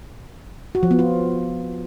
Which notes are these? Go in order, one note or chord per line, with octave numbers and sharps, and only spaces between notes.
F#4
F3
B3
F4